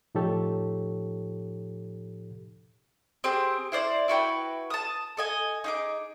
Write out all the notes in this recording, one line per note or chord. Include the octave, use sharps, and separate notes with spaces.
A2 F3 D#4 G4 A4 C#5
C4 G4 G#4
E4 C5 D5
E4 F#4 B4 G5
A5 D#6
A4 D#5 G#5
D#4 G#4 D6